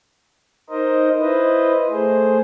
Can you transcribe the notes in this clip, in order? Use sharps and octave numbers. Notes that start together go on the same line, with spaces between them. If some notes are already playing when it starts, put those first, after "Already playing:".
D#4 A#4 C5 D#5
E4 B4 C5 D#5
A3 G#4 C5